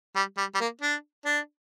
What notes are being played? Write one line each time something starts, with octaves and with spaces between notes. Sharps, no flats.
G3
G3
G3
A#3
D4
D4